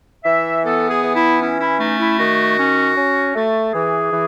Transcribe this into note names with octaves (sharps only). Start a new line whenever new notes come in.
E3 E5
B3 A4
G#4
E3
E4
C#4 E4
E4
A3 D#4
E4
D#3 F#4
C#4
C#4
A3
E3 G#4
E3